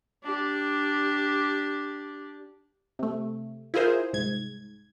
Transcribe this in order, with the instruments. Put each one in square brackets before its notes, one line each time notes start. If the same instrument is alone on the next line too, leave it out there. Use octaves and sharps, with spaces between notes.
[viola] D4 G4
[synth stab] C3 A3
E4 F4 G#4 A#4 C5
C2 G#2 G#6